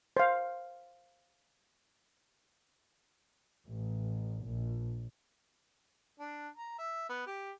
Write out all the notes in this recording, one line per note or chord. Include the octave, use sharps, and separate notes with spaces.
C5 F5
A1
A#1
D4
A#5
E5
B3
G4